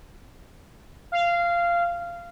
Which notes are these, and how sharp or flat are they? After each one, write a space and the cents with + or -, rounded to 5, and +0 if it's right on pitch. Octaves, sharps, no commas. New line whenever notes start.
F5 -15